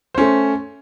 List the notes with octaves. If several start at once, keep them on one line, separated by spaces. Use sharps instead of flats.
A3 C#4 C5